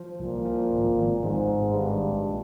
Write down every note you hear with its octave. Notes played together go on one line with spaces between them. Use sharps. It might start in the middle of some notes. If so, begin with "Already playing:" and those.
Already playing: F3
C2 A#2
F3
G#1
G#1
G#1 G#2
G#1
G2 G#3
A#1
A#2